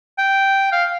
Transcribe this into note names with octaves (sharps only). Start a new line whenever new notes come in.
G5
F5